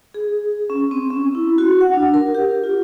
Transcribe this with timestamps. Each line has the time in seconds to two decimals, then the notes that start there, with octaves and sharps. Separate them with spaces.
0.14 G#4
0.70 C#4
0.91 C4
1.10 C#4
1.35 E4
1.58 F#4
1.81 F#5
1.93 D4
2.14 A#4
2.35 G4
2.64 F4